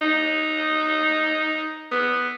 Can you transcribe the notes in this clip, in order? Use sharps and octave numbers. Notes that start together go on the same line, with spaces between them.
D#4
B3